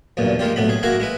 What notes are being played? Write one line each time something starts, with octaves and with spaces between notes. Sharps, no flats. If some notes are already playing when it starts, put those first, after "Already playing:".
B1 E2 G2 A#2
G#3 A#3 F4 G4
B1 A2 B3 B5
G#4
A#3 E4 F#4 G#4 A#4
G#3 E4 B4